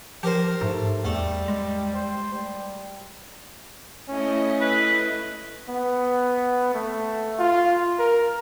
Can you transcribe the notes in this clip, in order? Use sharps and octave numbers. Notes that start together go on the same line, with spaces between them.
F3 G4 A#4 C5
G#2 A3
E2 G3 A3
G#3
C5
G3
A3 C#4 E4 D#5
B4
B3
A3
F4
A#4